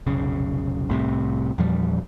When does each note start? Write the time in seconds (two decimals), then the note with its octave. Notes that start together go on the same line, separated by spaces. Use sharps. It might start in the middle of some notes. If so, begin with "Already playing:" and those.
0.06 F1 B1 C#3
0.89 C2 A2 C3
1.58 E2 A#2 F3 G3